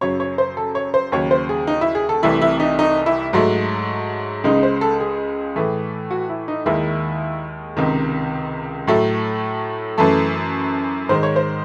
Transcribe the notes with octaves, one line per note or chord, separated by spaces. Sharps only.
F#2 C#3 F#3 C#5
C#5
C5
A4
C#5
C5
D#2 C#3 F#3 C#5
C5
G#4
D#4
E4
G#4
A4
C2 C3 E3 A3 E4
E4
D#4
D#4
E4
G#2 F#3 A3
C#2 C#3 G#3 D#4
C5
A4
G#4
A2 E3 A3
F#4
E4
D#4
D#2 D#3 G#3 E4
C#2 C3 D#3
A2 F#3 A3
F#2 E3 A3 A4
G#2 D#3 G#3 C5
C#5
C5